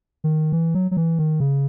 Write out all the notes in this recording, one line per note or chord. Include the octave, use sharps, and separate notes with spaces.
D#3
E3
F#3
F#3
E3
D#3
C#3